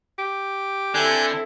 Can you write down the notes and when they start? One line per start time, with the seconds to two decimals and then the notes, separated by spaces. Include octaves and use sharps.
0.18 G4
0.94 D3 C4 E4 A4 G#5 F#6 G6